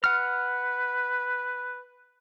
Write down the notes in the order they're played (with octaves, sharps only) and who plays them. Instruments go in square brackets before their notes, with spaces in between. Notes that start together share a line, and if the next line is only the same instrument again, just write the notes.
[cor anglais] B4 [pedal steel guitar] F#5 F6